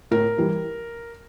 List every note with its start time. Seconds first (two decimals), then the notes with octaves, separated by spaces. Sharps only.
0.11 A2 A#4
0.38 E3 G3